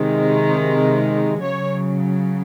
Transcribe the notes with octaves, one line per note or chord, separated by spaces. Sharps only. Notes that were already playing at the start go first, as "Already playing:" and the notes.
Already playing: C3 D#3 G#3
C#3 F#3 C#5